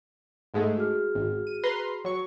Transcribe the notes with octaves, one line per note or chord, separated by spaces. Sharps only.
G#2 G#3 A3
F#4 G#4 F6
G#1
D#7
B4 A#5 C6
F#3 C#6